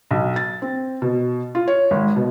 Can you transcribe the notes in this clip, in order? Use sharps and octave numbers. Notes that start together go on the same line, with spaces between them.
B1
A6
C4
B2
F4
C#5
G#1
B2